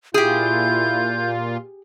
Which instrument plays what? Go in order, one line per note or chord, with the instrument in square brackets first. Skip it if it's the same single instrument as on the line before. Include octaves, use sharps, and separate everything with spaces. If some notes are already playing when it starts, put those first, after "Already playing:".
[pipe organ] A#2 F4 [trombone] E4 [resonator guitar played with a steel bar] G4 G#4 [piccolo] G6